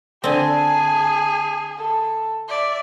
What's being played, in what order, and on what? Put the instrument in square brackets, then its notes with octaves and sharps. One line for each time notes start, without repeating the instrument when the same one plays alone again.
[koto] D3 C4 [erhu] G#4 [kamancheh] G#5 A5
[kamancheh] A4
[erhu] D5 [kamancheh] E5